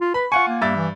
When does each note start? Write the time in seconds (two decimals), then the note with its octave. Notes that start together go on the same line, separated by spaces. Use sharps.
0.01 F4
0.14 B4 B5
0.32 F4 F#5 G#5 C#6
0.48 A#3
0.62 G2 E5 A6
0.76 E3